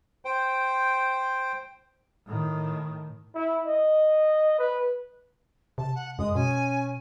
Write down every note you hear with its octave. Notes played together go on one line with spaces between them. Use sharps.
C5 G5
A2 D#3
E4
D#5
B4
C3 A5
F#5
F#2 G#3 D#6
B2 C#4 G#5